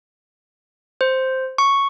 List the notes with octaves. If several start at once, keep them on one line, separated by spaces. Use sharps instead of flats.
C5
C#6